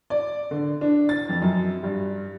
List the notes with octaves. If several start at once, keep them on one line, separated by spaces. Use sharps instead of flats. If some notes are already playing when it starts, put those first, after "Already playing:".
D5
D3
D4
A6
F2
F#2
G2